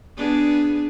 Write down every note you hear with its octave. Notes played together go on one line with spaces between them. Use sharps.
B3 D4 G#4